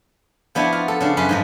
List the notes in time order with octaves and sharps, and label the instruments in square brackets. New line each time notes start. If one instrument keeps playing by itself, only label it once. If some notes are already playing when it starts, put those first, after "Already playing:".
[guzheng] F3 B3 D4 E4 F#4
F4
A4
C#3 D4
F#2 B4 F#5 C6
G#2 F3 D#5